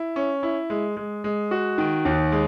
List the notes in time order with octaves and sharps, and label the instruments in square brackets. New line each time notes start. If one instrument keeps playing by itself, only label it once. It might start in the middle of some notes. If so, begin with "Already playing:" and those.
Already playing: [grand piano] E4
C#4
E4
G#3
G#3
G#3
F#4
D#3
D#2
G#3